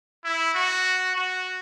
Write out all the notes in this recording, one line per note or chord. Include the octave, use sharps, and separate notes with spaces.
E4
F#4
F#4